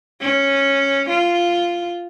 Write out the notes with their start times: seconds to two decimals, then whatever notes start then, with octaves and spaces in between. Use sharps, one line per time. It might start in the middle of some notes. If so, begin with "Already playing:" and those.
0.21 C#4
1.09 F4